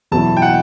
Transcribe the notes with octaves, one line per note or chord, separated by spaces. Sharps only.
E2 B2 F#3 B3 E4 A5
G5
F#5